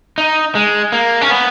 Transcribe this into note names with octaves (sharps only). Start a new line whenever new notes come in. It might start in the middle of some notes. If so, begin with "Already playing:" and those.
D#4
G#3
A#3
C#4
B3